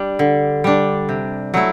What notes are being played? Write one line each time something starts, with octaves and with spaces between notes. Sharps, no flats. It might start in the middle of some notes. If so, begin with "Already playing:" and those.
Already playing: G3 D4
D3
G3 D4
C3
F#3 A3 E4